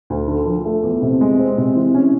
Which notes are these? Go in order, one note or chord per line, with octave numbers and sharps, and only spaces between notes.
D2
D3
F3
A3
E2
C3
G#3
C4
C3
E3
C#4